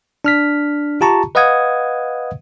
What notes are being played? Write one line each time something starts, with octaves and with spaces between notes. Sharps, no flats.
D4 F6 B6
F4 G4 A5 A#5 C#6
B4 D#5 F5 F#5 D#6 G#6